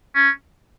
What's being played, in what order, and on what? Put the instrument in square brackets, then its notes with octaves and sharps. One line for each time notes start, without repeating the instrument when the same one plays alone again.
[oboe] C#4